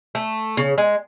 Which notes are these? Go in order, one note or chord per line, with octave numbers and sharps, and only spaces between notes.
A3
C#3
G#3